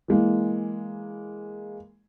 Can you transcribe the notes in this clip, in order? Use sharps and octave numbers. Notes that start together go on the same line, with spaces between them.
E3 G#3 A#3